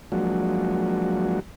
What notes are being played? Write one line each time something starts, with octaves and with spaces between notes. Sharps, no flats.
F3 F#3 G#3 A#3 D4 F#4